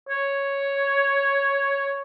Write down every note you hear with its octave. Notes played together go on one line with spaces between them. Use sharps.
C#5